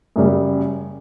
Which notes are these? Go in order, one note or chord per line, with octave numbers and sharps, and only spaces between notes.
F#2 C#3 G3